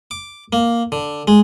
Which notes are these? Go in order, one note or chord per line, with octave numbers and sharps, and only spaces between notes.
D6
A#3
D3
G#3